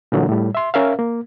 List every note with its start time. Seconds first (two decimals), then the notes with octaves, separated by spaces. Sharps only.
0.12 A#2 D3 E3 F#3
0.29 A2 G3
0.55 E5 C6
0.74 C#4 A#4 E5 F5
0.99 A#3